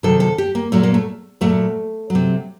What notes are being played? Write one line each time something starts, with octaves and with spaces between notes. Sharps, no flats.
C3 D#3 F#3 A4
A4
G4
A#3
A#2 F#3 A3
A#3
A3
A#2 F#3 A3
F#3
C3